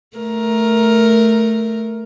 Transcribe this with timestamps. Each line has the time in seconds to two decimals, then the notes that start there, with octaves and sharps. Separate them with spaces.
0.17 A3 A#4